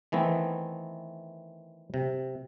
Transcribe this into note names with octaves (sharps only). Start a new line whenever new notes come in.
D#3 E3 A3 B3 C4
C3